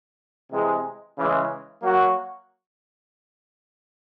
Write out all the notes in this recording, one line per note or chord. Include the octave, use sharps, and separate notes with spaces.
C3 E3 G#3
C#3 E3 G#3
F#3 A#3 F#4